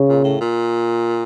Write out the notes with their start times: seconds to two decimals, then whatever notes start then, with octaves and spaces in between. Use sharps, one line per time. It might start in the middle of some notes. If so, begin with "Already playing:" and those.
Already playing: C#3
0.09 A#2
0.24 A2
0.41 A#2